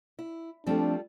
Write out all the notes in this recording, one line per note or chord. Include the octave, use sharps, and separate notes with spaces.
E4
F3 G3 A3 C4 D4 F4 A4